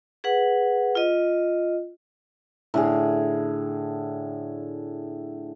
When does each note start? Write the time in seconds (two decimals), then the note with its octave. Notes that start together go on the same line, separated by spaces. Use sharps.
0.24 G#4 B4 F#5
0.95 F4 D#5
2.74 A2 D3 G#4